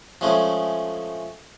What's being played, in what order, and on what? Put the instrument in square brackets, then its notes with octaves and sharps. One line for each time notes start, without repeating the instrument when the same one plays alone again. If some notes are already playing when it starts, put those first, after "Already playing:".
[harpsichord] F3 G#3 A3 C#4